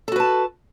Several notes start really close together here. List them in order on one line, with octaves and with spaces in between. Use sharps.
A4 F#4 B4 A5